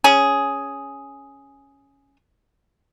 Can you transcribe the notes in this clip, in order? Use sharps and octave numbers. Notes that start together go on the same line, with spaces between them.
C#4 G#4